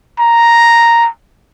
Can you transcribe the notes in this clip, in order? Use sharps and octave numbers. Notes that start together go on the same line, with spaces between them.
A#5